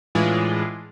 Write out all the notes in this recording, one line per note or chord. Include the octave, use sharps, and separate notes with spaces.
A2 E3 G#3 D4 F4 G#4